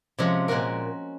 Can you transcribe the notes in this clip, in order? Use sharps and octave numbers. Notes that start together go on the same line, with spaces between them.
C3 F3 G#3 C#4
A#2 G#3 C#4 F#4 A#4